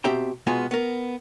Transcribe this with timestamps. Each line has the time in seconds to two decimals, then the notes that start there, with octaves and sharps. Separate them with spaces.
0.04 B2 C4 G4 E5 G5 A#5
0.47 B2 G#3 B3 F4 G#5 A#5
0.71 B3 A#4